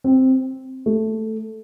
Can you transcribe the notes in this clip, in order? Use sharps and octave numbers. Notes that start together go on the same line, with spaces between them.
C4
A3